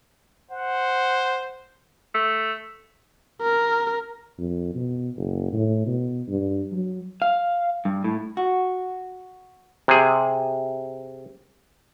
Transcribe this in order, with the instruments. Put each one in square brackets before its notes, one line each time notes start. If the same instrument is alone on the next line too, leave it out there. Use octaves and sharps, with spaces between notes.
[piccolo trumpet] C5 [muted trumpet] F#5
[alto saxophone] A3
[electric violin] A#4
[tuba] F2
B2
F#1
A2
B2
G2
F#3
[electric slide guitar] F5
G2
A2
[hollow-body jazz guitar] F#4
[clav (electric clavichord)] C3 G#4